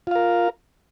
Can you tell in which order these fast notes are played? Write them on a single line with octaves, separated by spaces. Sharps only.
F4 F5 A#4